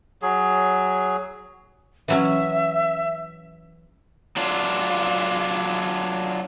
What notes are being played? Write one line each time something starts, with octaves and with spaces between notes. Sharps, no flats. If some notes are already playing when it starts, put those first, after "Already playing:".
F#3 G#4
E3 F#3 C#4 E5
F#3 D4 F4